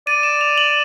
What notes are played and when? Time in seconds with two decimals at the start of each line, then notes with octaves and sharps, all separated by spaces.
0.07 D5 D#7
0.23 E7
0.41 F7
0.58 F#7